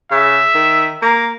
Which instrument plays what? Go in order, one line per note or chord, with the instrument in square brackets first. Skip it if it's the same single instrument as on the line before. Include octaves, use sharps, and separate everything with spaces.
[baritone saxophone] C#3 [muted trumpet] E5
[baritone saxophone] D#3
[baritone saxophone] A#3 [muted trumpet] A#5